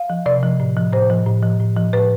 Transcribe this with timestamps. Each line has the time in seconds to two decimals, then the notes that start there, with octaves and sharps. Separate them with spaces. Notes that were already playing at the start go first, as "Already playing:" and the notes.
Already playing: F5
0.10 F3
0.26 C3 D5
0.43 F3
0.60 A2
0.77 F3
0.93 A2 C5
1.10 F3
1.26 A2
1.43 F3
1.60 A2
1.77 F3
1.93 A2 B4